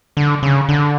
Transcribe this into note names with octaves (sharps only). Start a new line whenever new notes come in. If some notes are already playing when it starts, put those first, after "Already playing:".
D3
C#3
D3